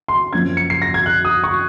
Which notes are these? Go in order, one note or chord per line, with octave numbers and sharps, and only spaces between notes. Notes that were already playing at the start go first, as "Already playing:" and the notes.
C6
F#2 F3 A#3 C#4 G#6
C#7
C7
A#6
G#6
F#6
D#6
C#6